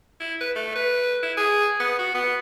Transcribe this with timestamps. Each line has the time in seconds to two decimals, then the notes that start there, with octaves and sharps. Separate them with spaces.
0.20 E4
0.41 B4
0.56 A3
0.76 B4
1.23 E4
1.37 G#4
1.80 B3
1.99 F#4
2.15 B3